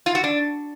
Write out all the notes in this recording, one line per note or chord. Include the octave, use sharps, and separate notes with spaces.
F4
F#4
D4